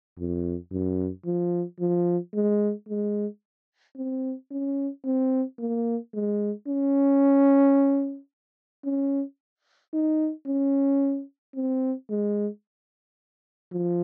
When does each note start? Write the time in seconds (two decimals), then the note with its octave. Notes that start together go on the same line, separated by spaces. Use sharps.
0.18 F2
0.72 F#2
1.26 F3
1.80 F3
2.34 G#3
2.89 G#3
3.96 C4
4.51 C#4
5.05 C4
5.59 A#3
6.14 G#3
6.67 C#4
8.85 C#4
9.93 D#4
10.47 C#4
11.55 C4
12.10 G#3
13.72 F3